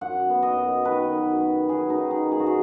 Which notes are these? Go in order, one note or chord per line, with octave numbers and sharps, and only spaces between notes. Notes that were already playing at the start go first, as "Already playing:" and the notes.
F#2 F#5
B3
D#5
F#2
D#3 B4
F#2
B3
F#2 G#4
D#4
D#3
G#4
F#2
G#4
F#4
G#4